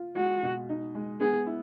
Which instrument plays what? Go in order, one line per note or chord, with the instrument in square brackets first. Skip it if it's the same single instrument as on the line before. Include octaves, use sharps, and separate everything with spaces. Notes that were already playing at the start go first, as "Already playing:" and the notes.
Already playing: [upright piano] F4
[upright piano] G#3 [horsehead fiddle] F#4
[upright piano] B2
D#4
G#3
[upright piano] B3 [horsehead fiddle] G#4
[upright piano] E4